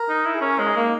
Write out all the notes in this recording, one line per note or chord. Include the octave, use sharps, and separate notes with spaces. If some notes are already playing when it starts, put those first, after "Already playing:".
Already playing: A#4
D#4
E4
G#4
C#4 A#4
G#3
D#4
A#3